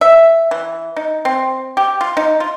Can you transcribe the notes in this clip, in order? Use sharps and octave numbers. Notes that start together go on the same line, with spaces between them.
E5
E3
D#4
C4
G4
F4
D#4
F4